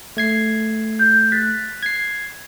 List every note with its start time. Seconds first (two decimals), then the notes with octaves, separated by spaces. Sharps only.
0.17 A3 G#6 C7
0.99 G6
1.32 F#6 A6 B6
1.83 G#6 C7